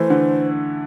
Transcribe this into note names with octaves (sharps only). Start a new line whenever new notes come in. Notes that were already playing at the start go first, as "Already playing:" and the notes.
Already playing: E3 A3 C5
D3